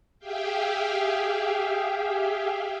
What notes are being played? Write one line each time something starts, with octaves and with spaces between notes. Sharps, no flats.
G4 G#4 E5 F5 G5